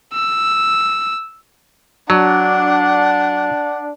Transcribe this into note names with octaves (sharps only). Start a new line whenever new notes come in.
E6
F#3 D4 F#5